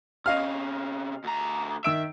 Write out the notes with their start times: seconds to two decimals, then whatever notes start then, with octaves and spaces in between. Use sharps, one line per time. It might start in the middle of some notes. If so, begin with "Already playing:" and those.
0.26 C3 C#4 D#5 F5 F6
1.24 D2 A#5
1.84 D#3 E5 E6 D7